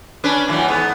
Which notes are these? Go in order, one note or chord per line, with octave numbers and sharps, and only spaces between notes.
C#4 D4 B4
A2 E3 F#3
G#2 B3